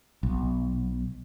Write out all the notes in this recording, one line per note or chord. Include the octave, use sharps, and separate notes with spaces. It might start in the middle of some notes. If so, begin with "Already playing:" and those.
B1